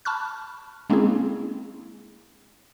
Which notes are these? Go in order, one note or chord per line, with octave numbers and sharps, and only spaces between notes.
A5 B5 C#6 F6 F#6
G#3 A#3 C4 C#4 E4 G#4